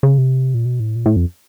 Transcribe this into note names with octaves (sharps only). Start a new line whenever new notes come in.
C#3
C3
A#2
B2
A2
A#2
A2
F2